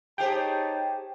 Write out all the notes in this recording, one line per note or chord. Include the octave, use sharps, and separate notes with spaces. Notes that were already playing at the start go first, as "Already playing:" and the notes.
D#4 G4 G#4 C5 C#5 G5 A5